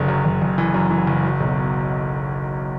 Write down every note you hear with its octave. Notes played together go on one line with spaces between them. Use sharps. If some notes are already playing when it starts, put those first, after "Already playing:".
Already playing: F#1 D3
F#2
F#1
F#1
E3
F#2
E3
F#1
F#3
B1
B2